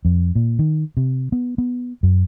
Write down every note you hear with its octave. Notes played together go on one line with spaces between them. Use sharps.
F2
A#2
D#3
C3
B3
B3
F#2